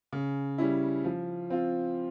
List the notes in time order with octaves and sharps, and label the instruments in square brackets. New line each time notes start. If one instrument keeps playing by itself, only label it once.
[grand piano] C#3
G3 C#4 E4
F3
C4 F4